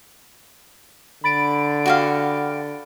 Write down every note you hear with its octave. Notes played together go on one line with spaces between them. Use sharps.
D3 B5 A6 D7
F#4 G4 F5